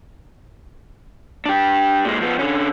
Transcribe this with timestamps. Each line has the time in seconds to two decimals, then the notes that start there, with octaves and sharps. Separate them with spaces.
1.46 D4 G4
2.05 A#2 G#3
2.20 F3 B3
2.39 D3 C#4